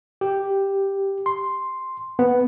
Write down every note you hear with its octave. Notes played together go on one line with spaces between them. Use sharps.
G4
C6
B3